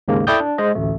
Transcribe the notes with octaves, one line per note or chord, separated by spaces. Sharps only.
D#2 G#2 C#3 A#3
E4 A4 D5 G5 D#6 G6
D4
G#3 C5 D#5
A1 D2 A3